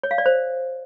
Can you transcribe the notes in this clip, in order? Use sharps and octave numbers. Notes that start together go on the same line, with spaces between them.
C#5
F5
D5
C5